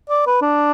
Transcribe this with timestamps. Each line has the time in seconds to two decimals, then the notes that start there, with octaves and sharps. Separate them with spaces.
0.10 D5
0.27 B4
0.42 D4